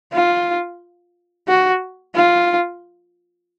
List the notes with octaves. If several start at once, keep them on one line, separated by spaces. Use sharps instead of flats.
F4
F#4
F4